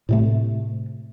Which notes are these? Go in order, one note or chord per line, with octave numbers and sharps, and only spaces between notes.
A2 C3 A3